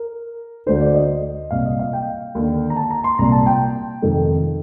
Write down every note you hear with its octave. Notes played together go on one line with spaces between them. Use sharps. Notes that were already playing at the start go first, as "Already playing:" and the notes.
Already playing: A#4
D2 D3 C5
D5
D#5
C2 A#2 F5
D#5
F5
G5
D#2 D3
A#5
A5
A#5
C6
C2 A#2 A#5
A5
G5
F2 C3 D#3 A4